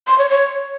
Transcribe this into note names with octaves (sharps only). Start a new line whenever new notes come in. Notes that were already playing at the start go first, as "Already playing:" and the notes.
C6
C#5
C#5